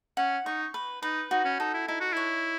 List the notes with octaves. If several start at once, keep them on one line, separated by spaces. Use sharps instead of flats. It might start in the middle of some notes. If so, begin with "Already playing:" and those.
C#4 F#5
D#4 C#6
B4
D#4 B4
D#4 F#4
C#4
D#4 A4
E4
D#4 E4
F#4
E4 C#5